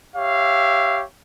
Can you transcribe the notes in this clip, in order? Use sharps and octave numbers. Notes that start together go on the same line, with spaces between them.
G4 C#5 E5 F5